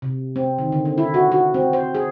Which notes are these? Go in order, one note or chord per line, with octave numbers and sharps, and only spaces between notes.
C3
C4
D#3
D3
C4
E4
F#4
F#4
C4
C5
G#4